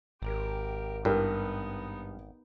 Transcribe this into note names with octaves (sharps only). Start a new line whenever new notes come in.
G#1 G4 A#4
G2 B3 D#4 G4 A#4